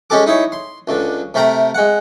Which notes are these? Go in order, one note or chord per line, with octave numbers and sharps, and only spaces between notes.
G#3 C#4 G4 A4 D6
D#4 E4 C#5
C6
C#2 D3
C3 A3 A#4 G5 A#5
G#3 F#5